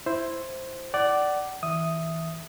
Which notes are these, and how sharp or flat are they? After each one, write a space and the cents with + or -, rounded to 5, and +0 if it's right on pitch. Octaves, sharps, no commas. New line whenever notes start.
E4 +5 C5 +0
D5 +0 F#5 +30
E3 -20 E5 +0 D#6 +0